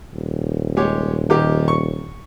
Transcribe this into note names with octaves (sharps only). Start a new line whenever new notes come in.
D#1
G#3 G4 C#5
D#2 G4
C#6